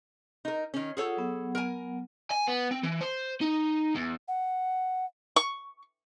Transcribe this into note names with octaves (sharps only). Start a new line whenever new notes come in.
D#4 A#4
D#3 C#4
F4 G#4 A4 C#5 F#5
F#3 B3 F#5
A#4 G#5
G#5
B3
C4
E3
C5
D#4
E2
F#5
C#6